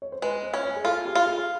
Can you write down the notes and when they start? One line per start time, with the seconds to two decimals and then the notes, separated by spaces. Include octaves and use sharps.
0.02 C#5
0.12 C5
0.22 G#3 B4
0.43 C5
0.54 C#4
0.64 C#5
0.76 G#4
0.84 F4 A4
1.05 G4
1.15 F4
1.26 G#4